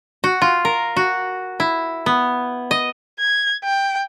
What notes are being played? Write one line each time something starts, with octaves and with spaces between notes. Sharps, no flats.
F#4
F4
A#4
F#4
E4
B3
D#5
G#6
G5